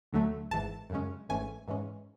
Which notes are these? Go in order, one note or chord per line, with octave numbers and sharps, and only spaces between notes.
D2 D3 F#3 A3
G#1 G#2 E3 A5
F#2 C#3 G#3 C#4
G#1 G#2 E3 A3 C#4 G#5
G#2 E3 G#3 C#4